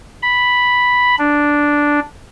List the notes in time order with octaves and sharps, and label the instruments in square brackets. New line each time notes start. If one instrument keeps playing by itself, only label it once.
[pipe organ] B5
D4